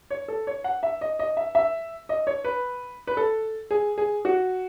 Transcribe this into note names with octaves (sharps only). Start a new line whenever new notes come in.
C#5
A4
C#5
F#5
E5
D#5
D#5
E5
E5
D#5
C#5
B4
B4
A4
G#4
G#4
F#4